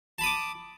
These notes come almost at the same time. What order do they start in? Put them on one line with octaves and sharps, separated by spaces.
A5 B5 D#6 D6